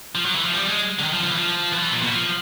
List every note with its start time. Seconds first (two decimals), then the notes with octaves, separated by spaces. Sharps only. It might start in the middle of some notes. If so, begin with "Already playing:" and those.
0.15 F3
0.25 F#3
0.35 E3
0.45 F3
0.54 G3
0.68 G#3
0.99 D3
1.04 D#3
1.13 F3
1.24 F3
1.31 E3
1.38 F3
1.72 E3
1.78 F3
1.83 E3
1.92 A#2
2.02 B2
2.12 F3